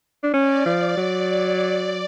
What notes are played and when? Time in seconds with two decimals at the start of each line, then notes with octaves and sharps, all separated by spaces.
0.23 D4
0.34 C#4 D5
0.65 F3 D5
0.97 F#3 D5